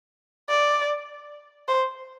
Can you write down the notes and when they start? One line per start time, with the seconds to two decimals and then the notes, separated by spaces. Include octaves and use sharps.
0.49 D5
1.68 C5